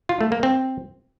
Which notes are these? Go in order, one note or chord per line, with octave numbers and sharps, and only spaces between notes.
F4
A3
A#3
C4